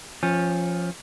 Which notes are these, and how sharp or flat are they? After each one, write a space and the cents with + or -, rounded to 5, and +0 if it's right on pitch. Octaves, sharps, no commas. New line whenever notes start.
F3 +0 C#4 -20